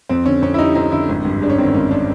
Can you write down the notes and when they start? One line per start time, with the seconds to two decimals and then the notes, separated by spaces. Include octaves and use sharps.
0.09 F2 C4
0.26 D3 C#4
0.42 F2 C#4
0.54 E4
0.59 G3 D#4
0.75 F2 D#4
0.92 D3 E4
1.09 G#1
1.25 G2
1.41 G#3 D4
1.50 C#4
1.58 D#3 C4
1.74 G#1 C#4
1.91 D4